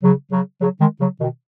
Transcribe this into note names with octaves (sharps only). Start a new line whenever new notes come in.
C#3 F#3
C#3 F#3
C#3 F#3
D#3 G#3
C#3 F#3
B2 D#3